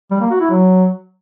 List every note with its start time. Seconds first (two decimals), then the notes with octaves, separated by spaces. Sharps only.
0.11 G3
0.21 A#3
0.31 F#4
0.40 E4
0.50 F#3